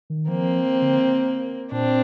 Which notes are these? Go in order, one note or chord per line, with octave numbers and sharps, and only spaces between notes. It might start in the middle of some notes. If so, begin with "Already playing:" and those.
D#3
F3 A#3 C4
D3
A#2 C4 D4